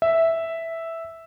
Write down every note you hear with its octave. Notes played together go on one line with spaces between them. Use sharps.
E5